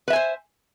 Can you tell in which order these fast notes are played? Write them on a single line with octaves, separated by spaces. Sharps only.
B4 E5 G#5 C5